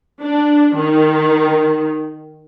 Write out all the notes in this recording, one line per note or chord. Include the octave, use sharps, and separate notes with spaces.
D4
D#3